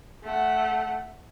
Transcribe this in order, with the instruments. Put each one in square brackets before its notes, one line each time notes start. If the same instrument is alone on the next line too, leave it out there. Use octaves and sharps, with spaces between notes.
[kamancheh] A3 F#5